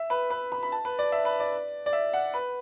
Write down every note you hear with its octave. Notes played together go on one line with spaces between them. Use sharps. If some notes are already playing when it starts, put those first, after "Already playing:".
Already playing: E5
B4
B4
B5
B5
A5
B4
D5
E5
B4
D5
D5
E5
F#5
B4